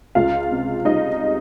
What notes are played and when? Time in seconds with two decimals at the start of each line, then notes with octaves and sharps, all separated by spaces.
0.15 C#2 F4 F5
0.50 C3
0.85 G3 D#4 D#5